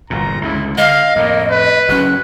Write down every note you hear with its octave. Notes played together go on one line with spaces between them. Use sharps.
G1 E2 A#2 A#5
C#2 D3 E4
D3 D#5 F5
F2 A2 A#3
B4
F#1 F#3 C#4 F#6